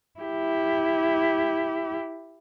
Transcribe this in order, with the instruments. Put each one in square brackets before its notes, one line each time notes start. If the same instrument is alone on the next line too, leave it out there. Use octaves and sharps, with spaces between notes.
[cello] E4 G4